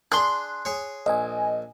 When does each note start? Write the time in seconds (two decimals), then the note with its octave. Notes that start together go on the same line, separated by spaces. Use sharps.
0.12 D4 G#4 C6 D6 F#6
0.65 G#4 C#5
1.06 A#1 D#5 G#5